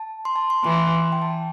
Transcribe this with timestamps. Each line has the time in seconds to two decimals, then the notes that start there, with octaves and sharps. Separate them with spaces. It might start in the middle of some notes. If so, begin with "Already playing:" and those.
Already playing: A5
0.25 C6
0.36 A5
0.50 C6
0.64 E3 C6
1.12 G5
1.22 A5